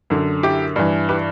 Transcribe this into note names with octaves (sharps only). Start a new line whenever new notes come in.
F#2 D3
E4 G4
G2 E3
G4 B4